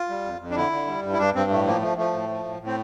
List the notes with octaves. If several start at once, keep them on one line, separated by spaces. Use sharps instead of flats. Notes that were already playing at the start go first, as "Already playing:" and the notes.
Already playing: F4
G3
F2
F2
D4
D3 E4
D3
G3
G2
E4
G2 D4
G2 C4
A2 A3
F3 A#3
F3 A3
F3 A3
A2
F3
A2
A2
C4